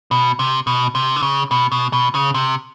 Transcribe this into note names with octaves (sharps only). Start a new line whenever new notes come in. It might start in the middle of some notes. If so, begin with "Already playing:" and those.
B2
C3
B2
C3
D3
C#3
B2
B2
B2
C#3
C3